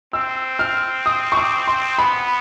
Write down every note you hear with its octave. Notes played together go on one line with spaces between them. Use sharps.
C4 E6
F6
D#6
C#6
D6
C6
B3 B5